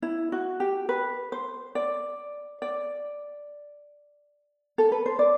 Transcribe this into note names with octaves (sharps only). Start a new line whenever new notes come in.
E4
F#4
G4
B4
C5
D5
D5
A4
B4
C5
D5